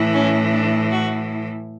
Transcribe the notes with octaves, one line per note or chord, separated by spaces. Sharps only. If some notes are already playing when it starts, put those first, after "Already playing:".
Already playing: A2 E3
C#4
D4
F#4